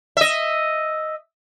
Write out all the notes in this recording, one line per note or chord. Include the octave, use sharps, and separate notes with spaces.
D#5 E5